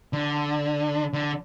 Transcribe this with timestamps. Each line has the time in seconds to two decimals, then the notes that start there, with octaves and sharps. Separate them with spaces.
0.13 D3
1.13 D3